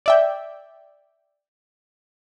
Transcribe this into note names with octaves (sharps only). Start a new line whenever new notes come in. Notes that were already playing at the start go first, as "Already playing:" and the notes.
D5 E5 G5